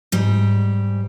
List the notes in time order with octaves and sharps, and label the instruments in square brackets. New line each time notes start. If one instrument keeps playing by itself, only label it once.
[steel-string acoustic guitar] G#2 G3